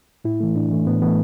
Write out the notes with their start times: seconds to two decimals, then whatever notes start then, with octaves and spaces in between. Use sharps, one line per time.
0.24 A2 E4
0.40 E3 A3
0.56 A2 D4
0.72 E3 A3
0.87 A2 B3
1.02 E3 A3 B3